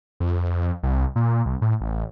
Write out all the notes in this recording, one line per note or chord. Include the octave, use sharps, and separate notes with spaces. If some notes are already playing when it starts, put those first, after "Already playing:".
F2
C2
A#2
C2
A2
A1